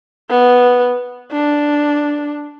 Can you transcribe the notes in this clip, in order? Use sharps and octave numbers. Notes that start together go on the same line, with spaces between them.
B3
D4